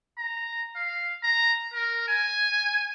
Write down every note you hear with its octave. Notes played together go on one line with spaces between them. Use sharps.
A#5
F5
A#5
A#4
G#5